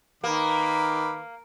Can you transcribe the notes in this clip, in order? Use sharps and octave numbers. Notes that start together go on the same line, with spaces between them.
D#3 A#3 B4 D6